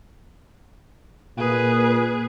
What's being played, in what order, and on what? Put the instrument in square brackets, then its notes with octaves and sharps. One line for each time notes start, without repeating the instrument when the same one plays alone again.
[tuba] A#2 [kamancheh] G#4 B4